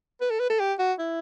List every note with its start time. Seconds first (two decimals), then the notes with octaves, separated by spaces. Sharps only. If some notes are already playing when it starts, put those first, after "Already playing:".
0.21 B4
0.30 A4
0.40 B4
0.50 A4
0.60 G4
0.79 F#4
0.99 E4